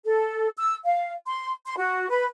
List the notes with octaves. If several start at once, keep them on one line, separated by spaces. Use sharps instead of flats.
A4
E6
F5
C6
C6
F#4
B4